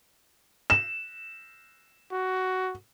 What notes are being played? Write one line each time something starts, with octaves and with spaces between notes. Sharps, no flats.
E7
F#4